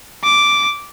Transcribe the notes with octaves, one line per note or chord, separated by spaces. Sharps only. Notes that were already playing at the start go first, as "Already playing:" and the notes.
D6